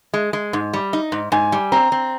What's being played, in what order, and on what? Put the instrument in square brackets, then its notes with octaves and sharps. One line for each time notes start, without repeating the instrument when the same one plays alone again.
[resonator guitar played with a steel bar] G#3
G#3
G#2
G3
D#4
G#2
[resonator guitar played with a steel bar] G#2 [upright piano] G#5
[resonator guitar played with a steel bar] G3
[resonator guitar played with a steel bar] C4 [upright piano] A#5
[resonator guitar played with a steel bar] C4